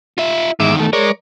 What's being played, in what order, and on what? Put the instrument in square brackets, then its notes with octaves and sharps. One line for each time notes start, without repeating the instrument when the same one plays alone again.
[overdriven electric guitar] F4 E5
[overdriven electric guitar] E2 D#3 [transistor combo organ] G#2 E5 D6
[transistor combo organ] A3
[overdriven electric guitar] G#3 [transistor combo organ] A#4 C#5 D5